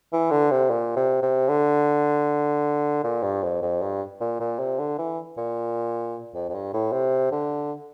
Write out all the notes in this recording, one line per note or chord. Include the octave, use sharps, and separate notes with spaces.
E3
D3
C3
A#2
C3
C3
D3
A#2
G2
F2
F2
G2
A#2
A#2
C3
D3
E3
A#2
F2
F2
G2
A2
C3
D3